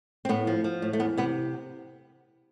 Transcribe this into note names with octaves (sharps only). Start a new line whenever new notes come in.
C4
A2 B3
F3
F3
A2
A3
E2 B3
C3 B3